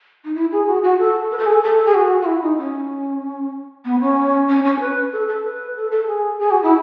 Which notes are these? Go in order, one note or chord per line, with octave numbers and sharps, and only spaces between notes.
D#4
E4
G#4
F#4
F#4
A4
B4
A4
G#4
A4
A4
G#4
F#4
F#4
E4
D#4
C#4
B3
C#4
C#4
C#4
B4
A4
A4
B4
A4
A4
G#4
G#4
F#4
E4